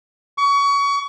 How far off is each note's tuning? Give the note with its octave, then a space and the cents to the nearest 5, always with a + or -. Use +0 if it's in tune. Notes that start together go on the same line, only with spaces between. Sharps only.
C#6 +30